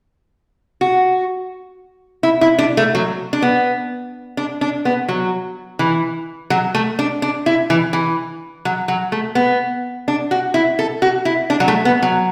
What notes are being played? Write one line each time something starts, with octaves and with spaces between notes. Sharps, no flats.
F#4
E4
E4
D4
A3
F#3
D4
B3
D4
D4
B3
F#3
E3
F#3
A3
D4
D4
E4
E3
E3
F#3
F#3
A3
B3
D4
F#4
E4
A4
F#4
E4
D4
F#3
A3
B3
F#3